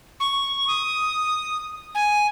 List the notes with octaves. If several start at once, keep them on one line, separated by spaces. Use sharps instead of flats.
C#6
D#6
G#5